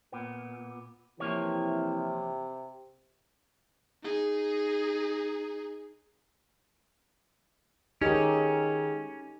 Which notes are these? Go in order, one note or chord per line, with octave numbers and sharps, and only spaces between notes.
A#2 B3
C3 E3 F3 A#3 C4 E4 C#5
D#4 G#4
D#3 G#3 C#4 D#4 G4 A4 D#5